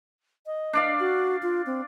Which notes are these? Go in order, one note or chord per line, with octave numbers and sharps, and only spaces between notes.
D#5
D4 D5 F5
F#4
F4
C4